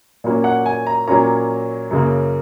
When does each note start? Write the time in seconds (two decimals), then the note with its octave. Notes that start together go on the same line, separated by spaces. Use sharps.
0.24 A#2 F#3 A#3 C#4
0.44 F#5
0.66 G#5
0.87 A#5
1.08 A#2 F#3 A#3 C#4 A#5
1.90 F#2 C#3 A#3